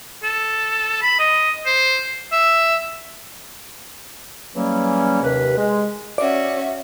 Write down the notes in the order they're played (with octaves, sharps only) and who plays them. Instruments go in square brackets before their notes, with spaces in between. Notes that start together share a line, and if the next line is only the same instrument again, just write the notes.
[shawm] A4
B5
D#5
C5
E5
[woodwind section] C#3 E3 F#3 G3 A#3 C#4
D#2 C3 B4
G#3
[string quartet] C#4 F#4 [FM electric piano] D5 [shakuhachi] E5